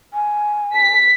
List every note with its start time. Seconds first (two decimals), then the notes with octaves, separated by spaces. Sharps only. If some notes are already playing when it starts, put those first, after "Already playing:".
0.14 G#5
0.74 B6